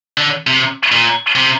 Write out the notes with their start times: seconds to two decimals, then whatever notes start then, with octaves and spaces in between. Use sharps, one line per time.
0.18 D3
0.47 C3
0.92 A#2
1.35 C3